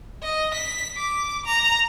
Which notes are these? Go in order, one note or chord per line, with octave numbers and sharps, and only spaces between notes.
D#5
B6
D6
A#5